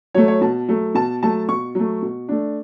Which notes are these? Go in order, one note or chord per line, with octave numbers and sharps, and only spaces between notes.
F#3 A3 C#5
C#5
B2 A5
F#3 A3
B2 A5
F#3 A3 A5
B2 C#6
F#3 A3
B2
A3 D4